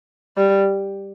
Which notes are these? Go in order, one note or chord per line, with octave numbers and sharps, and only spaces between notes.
G3